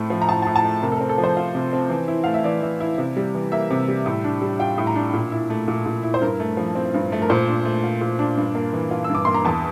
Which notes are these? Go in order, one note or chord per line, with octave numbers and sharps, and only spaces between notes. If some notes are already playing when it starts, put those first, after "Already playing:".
Already playing: A2 A3 C4
F3
A#5
A2 A5
A5
A2
A5
A3
C3 A#4
A4
C4 A#4
A4
F3
C5
F4
C3
C4
E3
E4
A3 F5
E5
E3 D5
E3
E4
C3
G3
E3
A#3 E5
C3
G3
A2
D4
G3
F4 G5
A2
A#5
D4
A#2
E4
A3
A#2
A#2
E4
C5
G2 A#4
A3
F3
C4
G2
A3
A#4
A#2 C5
D4
A3
F4
A#2
D4
G2
A#3
E3
F4
E6
G2
D6
A#3 C6
A#5
E2 A5